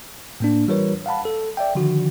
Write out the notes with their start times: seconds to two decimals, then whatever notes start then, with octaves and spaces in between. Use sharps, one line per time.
0.40 A2 A#3 D4
0.68 E3 G3 F4 A#4 B4 C#5
1.06 F5 F#5 A5 B5
1.25 A4
1.57 D5 E5 G5
1.75 D3 D#3 F3 F#4